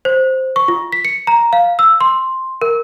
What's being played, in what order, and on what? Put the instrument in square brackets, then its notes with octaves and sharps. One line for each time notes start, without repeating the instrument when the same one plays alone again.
[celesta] C5
C#6
F4
B6
C#7
A#5
F5
E6
C6
A#4